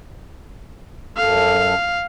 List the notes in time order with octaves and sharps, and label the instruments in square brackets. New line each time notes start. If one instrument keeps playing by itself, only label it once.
[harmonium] F#2 A4 [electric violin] F5